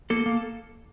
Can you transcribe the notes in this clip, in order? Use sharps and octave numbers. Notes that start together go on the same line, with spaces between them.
A#3 A4
A#3